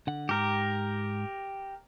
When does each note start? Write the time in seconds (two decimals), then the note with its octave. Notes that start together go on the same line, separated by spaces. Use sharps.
0.07 D3 F#5
0.29 G#2 G4 A#4